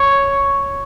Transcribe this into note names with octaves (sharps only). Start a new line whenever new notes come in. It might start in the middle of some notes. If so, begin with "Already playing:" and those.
Already playing: C#5